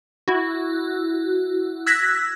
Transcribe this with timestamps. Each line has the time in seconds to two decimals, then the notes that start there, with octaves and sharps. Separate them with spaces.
0.28 E4 F#4
1.86 E6 F#6 G#6 A#6 B6